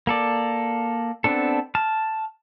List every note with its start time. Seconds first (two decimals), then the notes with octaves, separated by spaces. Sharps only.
0.07 A#3 A4 D5
1.24 B3 C4 D4 A4
1.75 A5 F6